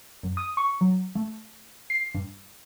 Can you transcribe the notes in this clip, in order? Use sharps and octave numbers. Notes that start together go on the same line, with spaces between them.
F#2
D#6
C#6
F#3
A3
C7
G2